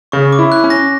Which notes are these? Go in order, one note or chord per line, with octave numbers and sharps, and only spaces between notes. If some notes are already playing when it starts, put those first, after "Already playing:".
C#3 C#6
D6
E4
F#6
C#4
A#6